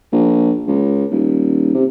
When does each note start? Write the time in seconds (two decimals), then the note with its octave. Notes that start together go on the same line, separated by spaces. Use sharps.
0.12 A#1
0.67 C#2
1.11 D#1
1.74 C3